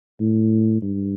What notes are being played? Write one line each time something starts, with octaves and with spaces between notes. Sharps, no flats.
A2
G2